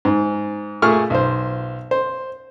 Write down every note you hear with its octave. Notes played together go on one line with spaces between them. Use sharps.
G#2
A#2 A3 G#4 C#6 F6
B1 C5
C5